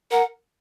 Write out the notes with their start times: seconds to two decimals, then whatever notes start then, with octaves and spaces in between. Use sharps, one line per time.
0.11 A#4 F#5